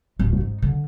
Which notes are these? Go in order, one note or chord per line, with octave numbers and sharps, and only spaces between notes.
D1 A3
G#2 D#4
D3